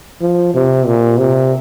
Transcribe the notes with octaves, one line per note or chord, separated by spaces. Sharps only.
F3
C3
A#2
C3